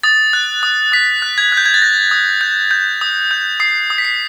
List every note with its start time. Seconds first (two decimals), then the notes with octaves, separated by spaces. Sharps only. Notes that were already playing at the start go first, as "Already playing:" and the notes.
0.03 D#6 A6
0.33 F#6
0.63 D#6
0.92 D#6 B6
1.22 F#6
1.38 G#6
1.52 F#6
1.57 G6
1.66 G#6
1.74 A6
1.82 G6 A#6
2.11 D#6
2.41 G6
2.71 G6
3.01 D#6
3.31 G6
3.60 D#6 C7
3.90 D#6
3.98 B6
4.05 C7